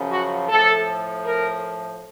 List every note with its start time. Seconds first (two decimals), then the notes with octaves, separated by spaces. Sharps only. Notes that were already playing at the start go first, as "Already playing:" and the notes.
Already playing: F#2 C#3 F3
0.12 F#4
0.49 A2 F3 A4
1.26 A#4